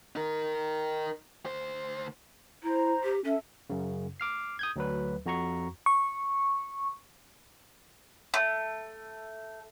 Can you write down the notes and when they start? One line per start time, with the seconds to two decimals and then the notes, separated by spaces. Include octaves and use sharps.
0.16 D#4 A#4
1.45 D2 C5
2.63 E4 C5 A#5
3.04 G4
3.24 C#4 A4 E5
3.70 F#2 C#3
4.20 D6 F6 C7
4.59 D#6 G6 G#6
4.76 D2 F#3 B4
5.26 F2 F#4 A#5 C#6
5.86 C#6
8.34 A3